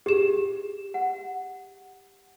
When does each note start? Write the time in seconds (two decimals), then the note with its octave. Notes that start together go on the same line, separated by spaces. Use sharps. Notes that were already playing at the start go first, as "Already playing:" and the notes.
0.06 G4 G#4 E7
0.94 F#5